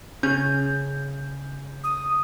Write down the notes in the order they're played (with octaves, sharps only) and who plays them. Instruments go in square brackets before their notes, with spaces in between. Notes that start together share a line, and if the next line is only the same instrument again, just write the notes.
[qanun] C#3 [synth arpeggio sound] C#4 [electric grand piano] G6
[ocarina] D#6